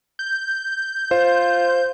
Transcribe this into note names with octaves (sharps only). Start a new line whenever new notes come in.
G6
F4 C5